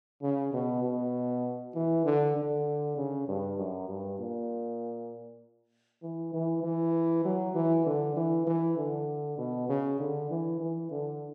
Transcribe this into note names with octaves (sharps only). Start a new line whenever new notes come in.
C#3
B2
B2
E3
D3
D3
C#3
G2
F#2
G2
A#2
E3
E3
E3
F#3
E3
D3
E3
E3
D3
B2
C#3
D3
E3
E3
D3